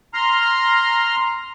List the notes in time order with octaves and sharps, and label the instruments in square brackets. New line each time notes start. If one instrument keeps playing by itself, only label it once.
[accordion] A#5 C6 F6